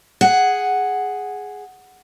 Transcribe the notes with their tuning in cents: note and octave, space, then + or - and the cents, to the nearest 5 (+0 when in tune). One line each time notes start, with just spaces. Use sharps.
G#4 +0 F#5 +0